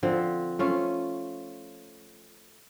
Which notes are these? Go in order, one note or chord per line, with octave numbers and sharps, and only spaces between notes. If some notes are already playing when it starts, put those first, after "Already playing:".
D3 F3 C4
A3 C#4 F4